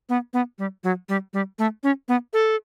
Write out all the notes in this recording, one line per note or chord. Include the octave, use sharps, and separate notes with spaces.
B3
B3
G3
F#3
G3
G3
A3
C#4
B3
A4